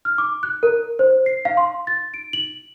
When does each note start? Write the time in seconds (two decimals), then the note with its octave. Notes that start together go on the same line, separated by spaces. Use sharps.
0.05 F6
0.18 D6
0.43 F#6
0.63 A#4
0.99 C5
1.26 C7
1.45 F5
1.57 C6
1.87 A6
2.14 D7
2.33 F#7